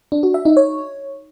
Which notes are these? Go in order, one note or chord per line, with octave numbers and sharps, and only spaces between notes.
D4
F#4
E5
D#4
C#5